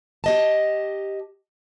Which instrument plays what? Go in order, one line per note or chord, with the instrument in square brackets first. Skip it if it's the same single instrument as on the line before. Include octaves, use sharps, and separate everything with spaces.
[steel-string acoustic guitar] G4 D#5 A5